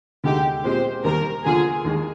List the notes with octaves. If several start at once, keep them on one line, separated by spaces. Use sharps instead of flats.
D2 D3 G#3 D#4 G4
A#2 G#3 C4 G4 C5
D#2 D#3 G3 A#4
D#2 D3 F3 A#3 F4 G#4
D#2 D#3 G#3